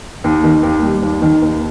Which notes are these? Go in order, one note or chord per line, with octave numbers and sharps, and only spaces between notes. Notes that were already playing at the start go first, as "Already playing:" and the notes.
D#2
D#3
D#2
G3
D#2
D#3
D#2